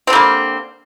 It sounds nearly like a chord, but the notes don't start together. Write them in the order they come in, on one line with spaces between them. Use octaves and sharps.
C4 D3 G3 A#3